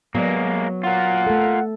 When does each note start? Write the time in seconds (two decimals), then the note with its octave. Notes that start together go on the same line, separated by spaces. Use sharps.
0.15 F#3 G#3 A#3 B3
0.84 F4 A#4 F#5
1.26 A3 A4